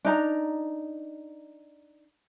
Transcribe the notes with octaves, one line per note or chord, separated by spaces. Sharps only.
D4 D#4 A#5